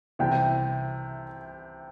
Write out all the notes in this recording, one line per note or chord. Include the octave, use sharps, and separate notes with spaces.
C2 C3 E3 G5